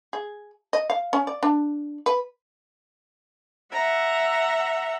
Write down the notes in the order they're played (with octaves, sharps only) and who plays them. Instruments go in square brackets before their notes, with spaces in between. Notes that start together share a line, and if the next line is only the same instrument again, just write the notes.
[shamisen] G#4
D#5
F5
C#4
D5
D4
B4
[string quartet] E5 F#5 A#5